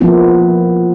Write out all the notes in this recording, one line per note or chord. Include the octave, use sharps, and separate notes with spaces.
F3 A#3 B3 E4 F4